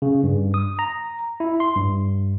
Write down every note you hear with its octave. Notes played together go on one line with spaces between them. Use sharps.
C#3
G2
D#6
A#5
E4
C6
G2